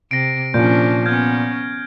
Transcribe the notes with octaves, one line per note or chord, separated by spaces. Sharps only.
C3 A#6 C7 D7
A#2 F3 C#4 D4 G6 D7
B3 C#4 F6 G6 G#6